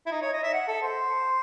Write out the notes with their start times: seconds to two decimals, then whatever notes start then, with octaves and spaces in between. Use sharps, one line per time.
0.06 E4
0.12 D#4
0.22 C#5
0.33 D#5
0.44 E5
0.54 F#5
0.68 A4
0.82 C5